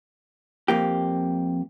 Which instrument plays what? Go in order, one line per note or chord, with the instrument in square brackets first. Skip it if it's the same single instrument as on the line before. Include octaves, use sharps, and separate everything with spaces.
[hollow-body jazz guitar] F2 A#3 G4